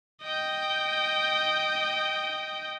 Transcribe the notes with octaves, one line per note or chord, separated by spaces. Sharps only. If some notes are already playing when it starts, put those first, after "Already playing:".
D#5 G5